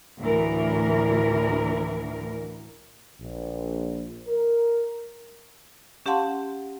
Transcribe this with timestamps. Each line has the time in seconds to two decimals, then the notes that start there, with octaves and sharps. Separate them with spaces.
0.19 D2 A2 E3 A#4
3.21 A#1
4.28 A#4
6.06 C#4 G4 F5 F#5 A5 C6